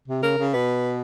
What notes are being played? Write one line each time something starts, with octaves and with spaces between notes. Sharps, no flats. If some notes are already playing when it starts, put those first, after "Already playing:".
C3
C#3 A#4
C#3
B2 B4